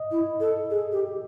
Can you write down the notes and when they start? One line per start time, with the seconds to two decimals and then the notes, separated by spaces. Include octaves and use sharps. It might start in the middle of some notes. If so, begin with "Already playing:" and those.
Already playing: D#5
0.11 E4
0.40 A4
0.71 G#4
0.92 G4